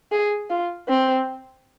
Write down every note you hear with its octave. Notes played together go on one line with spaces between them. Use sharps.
G#4
F4
C4